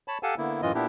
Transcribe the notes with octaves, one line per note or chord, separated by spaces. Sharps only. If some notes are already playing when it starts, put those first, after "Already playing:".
C#5 A5 B5
G4 A4 F5 F#5 G#5 A5
D3 A#3 B3 E4
F#2 A2 E3 F4 D#5
A#2 B3 D4 E4 G4